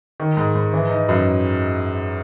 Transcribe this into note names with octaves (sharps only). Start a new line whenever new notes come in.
D#3
G#2
G#2
E3
D#4
F#2